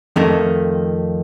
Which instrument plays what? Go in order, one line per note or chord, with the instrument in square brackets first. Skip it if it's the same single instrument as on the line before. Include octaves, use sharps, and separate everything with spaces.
[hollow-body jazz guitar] F2 D#3 A3